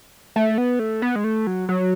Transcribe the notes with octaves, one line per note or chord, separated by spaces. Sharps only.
A3
B3
A3
B3
G#3
A3
F#3
F#3